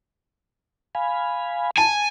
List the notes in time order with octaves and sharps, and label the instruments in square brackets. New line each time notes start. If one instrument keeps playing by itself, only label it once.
[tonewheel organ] F5 G#5 B5
[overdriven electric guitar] G#5 [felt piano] A5